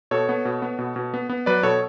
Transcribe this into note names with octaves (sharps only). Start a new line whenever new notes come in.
B2 A4 C#5
B3
B2
B3
B2
B2
B3
B3
F#3 B4 D5
B2 A4 C#5